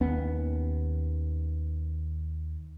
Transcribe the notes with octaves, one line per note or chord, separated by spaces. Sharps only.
D#2 B3 C#4